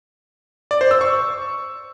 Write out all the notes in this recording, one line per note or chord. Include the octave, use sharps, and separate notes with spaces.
D5
C5
E6
C#6